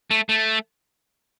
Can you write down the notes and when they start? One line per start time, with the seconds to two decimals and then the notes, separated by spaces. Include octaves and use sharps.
0.11 A3
0.29 A3